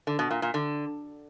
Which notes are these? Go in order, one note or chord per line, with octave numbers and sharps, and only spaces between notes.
D3
B2
A#2
A#2
D3